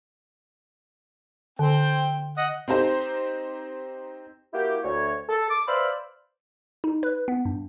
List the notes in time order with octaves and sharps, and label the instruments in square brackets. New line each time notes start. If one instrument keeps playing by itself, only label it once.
[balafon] D3 [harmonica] C4 G5
[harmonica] D#5 F#5
[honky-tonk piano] C4 D#4 G4 C5
[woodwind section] A#3 E4 F#4 G4
D2 C#5
A4
D6
B4 C5 D5 E5 F5 B5
[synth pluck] D#4
B4
B3
G2